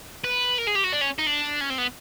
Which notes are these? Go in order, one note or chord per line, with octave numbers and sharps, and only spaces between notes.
B4
A#4
G#4
G4
F#4
D4
C#4
D#4
D4
C#4
C4
B3